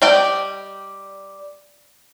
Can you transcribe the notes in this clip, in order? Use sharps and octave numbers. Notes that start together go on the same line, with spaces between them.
G3 D5 D#5 G5